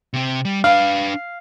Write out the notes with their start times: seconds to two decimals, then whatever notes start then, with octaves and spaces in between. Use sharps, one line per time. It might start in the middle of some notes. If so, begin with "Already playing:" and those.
0.13 C3 C4
0.45 G3
0.64 D4 B4 F5